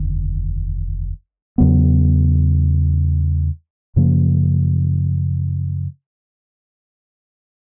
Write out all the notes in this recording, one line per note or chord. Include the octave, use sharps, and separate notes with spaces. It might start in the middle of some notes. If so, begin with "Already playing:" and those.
Already playing: F1 D#2 D3
E2 C#3 F#3 B3
F#2 C#3 F3 A#3